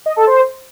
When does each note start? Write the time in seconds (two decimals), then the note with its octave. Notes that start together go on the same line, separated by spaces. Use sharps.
0.06 D#5
0.16 A4
0.27 C5